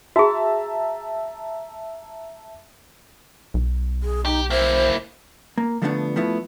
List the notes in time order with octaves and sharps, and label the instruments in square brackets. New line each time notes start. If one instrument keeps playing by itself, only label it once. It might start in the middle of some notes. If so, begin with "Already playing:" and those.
[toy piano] F#4 G#4 [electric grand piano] E5 A5 A#5
[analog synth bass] B1
[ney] G#4
[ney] D#4 [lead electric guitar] G4
[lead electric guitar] A#3 E4 [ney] C5
[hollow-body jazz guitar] A#3
D3 F3 A3 B3 C#4 D4
F3 A3 B3 E4